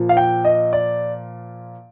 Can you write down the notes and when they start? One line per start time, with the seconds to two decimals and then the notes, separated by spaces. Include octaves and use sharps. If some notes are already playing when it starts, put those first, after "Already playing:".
Already playing: A#2 F3
0.09 F5
0.17 G5
0.45 D#5
0.73 D5